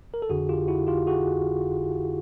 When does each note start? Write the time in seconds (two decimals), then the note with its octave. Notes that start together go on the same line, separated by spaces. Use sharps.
0.14 A#4
0.22 A4
0.29 F2 D3 F#4 G#4
0.49 F4 G4
0.68 E4 F#4
0.87 F4 G4
1.07 F#4 G#4